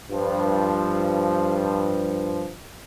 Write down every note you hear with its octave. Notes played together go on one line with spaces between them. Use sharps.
G2 F3